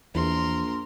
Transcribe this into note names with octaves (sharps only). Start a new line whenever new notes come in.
A#1 E2 A#4 C6